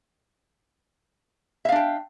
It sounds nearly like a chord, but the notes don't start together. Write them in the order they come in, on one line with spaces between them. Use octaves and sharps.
E5 F5 D4 G5